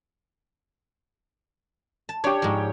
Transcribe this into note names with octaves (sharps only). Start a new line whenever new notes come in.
A5
D4 G4 C#5
G#2 F3